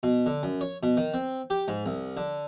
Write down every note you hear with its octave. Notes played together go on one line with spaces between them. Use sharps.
B2
D3
F#2
C#5
B2
D#3
C4
G4
G#2
C2
D3